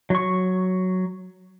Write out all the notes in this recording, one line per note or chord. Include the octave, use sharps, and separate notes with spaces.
F#3 C#6